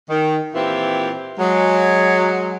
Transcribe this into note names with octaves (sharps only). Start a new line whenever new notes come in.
D#3
A#2 E3 C4 E4 F4 G4
F#3 G#3